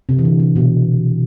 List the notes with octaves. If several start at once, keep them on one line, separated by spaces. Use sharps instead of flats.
C3
E3
D3
C3
B2